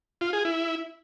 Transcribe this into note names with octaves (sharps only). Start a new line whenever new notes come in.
F4
G#4
E4